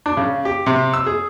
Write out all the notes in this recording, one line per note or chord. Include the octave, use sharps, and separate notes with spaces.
D4
C#3
G4
C3
E6
G#4